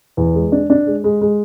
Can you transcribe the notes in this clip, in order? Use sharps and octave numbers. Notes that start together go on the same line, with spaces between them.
E2
G#3
D4
D4
G#3
G#3
G#3